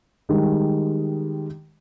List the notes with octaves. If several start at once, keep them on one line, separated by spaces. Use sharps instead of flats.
D#3 G3 G#3